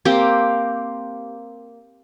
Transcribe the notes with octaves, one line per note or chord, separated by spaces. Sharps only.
A#3 C4 G4